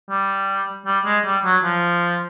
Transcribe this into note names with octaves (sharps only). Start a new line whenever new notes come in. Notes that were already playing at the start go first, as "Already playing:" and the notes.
G3
G3
G#3
G3
F#3
F3